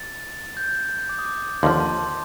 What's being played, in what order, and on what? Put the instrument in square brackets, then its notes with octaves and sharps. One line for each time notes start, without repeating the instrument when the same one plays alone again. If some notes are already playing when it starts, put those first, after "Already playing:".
Already playing: [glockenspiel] A6
G6
D6
D#6
D6
[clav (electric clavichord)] D#2 D3 F3 [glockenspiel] C6
[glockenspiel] A5